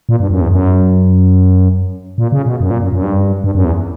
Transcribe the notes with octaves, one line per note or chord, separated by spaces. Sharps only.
A#2
G2
F#2
E2
F#2
A#2
C#3
B2
F#2
A#2
F#2
F#2
G2
G2
F#2
E2